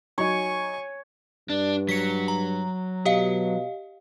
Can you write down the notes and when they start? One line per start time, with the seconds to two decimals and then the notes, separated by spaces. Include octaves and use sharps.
0.18 F#3 D#4 C#5 G#5 C#6
1.50 G2 D4
1.89 F#3 B6 C#7
2.28 A#5
3.05 B2 G4 D#5 F5